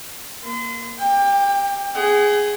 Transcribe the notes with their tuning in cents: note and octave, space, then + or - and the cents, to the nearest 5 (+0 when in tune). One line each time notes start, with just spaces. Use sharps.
A#3 +0 C6 -40
G4 +0 G5 +30
G#4 +0 F#5 +45